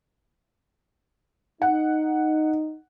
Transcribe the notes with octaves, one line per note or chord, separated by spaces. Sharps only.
D#4 F#5